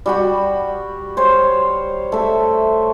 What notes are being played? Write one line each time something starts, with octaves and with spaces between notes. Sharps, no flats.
G3 F#4 B5
C5 C#5 F5
A3 E5